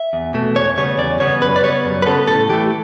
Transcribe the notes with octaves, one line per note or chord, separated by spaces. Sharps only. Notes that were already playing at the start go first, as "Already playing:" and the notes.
Already playing: E5
E2
B2 A3
E2 C#5
C#3 G3 B3 C#5
E2 D5
C#3 G3 B3 C#5
F#2 B4
D5
C#3 G3 B3 C#5
F#2
B4
C#3 G3 B3 A4
A2 A4
E3 A3 G4